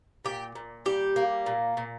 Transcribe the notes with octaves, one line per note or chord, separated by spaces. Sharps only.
A#2 G4
A#2
G3 G4
A#3
A#2
A#2